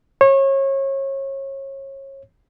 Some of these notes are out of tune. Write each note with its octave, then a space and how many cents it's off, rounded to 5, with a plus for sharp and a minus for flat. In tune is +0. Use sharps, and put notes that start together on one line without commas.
C#5 -30